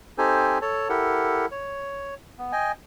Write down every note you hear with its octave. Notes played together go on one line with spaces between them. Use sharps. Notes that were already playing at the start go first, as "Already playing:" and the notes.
C4 D#4 G4 A4 C5 G#5
A4 C#5 A5
E4 G4 A4 A#4 F#5
C#5
B3
D#5 G5 G#5